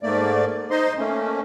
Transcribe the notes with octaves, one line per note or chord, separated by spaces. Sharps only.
G#2 A3 A#3 D5
D#4 C5 D#5 C6
A3 A#3 C#4